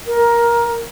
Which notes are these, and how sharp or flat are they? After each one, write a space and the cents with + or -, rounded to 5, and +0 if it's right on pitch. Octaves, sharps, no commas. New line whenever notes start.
A#4 +15